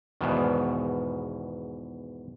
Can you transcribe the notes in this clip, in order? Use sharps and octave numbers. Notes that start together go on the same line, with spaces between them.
E2 G#2 B2 D#3